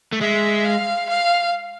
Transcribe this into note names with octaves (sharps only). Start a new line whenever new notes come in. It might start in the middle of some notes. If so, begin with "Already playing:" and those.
A3
G#3 E5
F5
F5